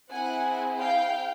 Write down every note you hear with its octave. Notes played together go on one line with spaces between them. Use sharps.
C4 E4 G#4 F#5 G#5
F5 G5